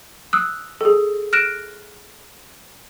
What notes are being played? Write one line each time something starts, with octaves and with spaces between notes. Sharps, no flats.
D#6 E6 F#6
G#4 A4
F6 F#6 A#6 D7 E7